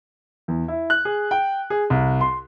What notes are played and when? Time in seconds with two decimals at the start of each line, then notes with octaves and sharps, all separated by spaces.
0.48 E2
0.68 E4
0.90 F#6
1.05 G#4
1.31 G5
1.70 G#4
1.90 C2
2.21 C6